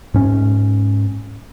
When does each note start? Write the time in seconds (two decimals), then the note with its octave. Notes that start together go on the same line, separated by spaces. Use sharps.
0.14 G#2 C#4